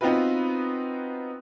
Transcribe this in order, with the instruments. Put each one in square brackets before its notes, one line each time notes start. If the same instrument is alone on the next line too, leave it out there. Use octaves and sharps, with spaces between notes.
[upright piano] B3 C4 D#4 F4 F#4 B4